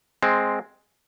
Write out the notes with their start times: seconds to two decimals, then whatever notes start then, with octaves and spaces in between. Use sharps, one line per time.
0.23 G#3 C4